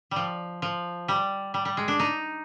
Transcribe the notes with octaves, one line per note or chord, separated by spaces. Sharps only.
F3 G3
F3
G3
G3
G3
G#3
D4
D#4